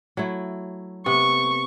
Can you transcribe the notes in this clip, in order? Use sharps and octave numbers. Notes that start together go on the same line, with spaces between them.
F#3 A3 E4
C3 B3 C#6